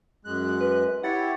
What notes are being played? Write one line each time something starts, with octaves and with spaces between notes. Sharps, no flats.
F#2 G#3 F#6
B4
E4 G4 C#5 F#5 A6 C#7